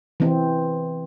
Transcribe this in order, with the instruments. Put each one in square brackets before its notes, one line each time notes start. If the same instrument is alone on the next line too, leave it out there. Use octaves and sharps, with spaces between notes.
[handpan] E3 C4